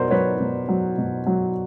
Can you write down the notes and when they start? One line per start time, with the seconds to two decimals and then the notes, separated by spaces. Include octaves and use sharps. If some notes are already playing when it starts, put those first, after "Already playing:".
Already playing: B2 F#3 A#4 C5 D5
0.10 F#3 B4 C#5
0.40 B2
0.68 F#3
0.98 B2
1.26 F#3